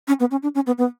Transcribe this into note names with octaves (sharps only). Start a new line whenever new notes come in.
C#4
B3
C#4
D4
C#4
B3
B3